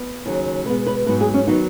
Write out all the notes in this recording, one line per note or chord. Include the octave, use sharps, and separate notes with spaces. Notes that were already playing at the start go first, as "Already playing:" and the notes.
Already playing: B3
D#2 C#3 F#3
B2 G#3 B3 B4
B4
G#2 F#3 B3 B4
G#4
C#4
D#3 F#3 B3 D#4